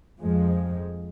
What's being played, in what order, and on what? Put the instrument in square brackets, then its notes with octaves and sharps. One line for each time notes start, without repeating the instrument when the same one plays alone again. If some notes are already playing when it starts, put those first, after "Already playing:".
[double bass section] F2 F3 G#3